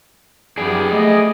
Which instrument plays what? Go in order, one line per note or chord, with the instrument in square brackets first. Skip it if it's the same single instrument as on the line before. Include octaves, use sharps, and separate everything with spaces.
[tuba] F#2 [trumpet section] G3 B3 G4 [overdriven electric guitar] G#4 D5
[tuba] A3 [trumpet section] D#5